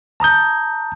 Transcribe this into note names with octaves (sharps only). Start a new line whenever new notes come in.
A5 A#5 D#6 G6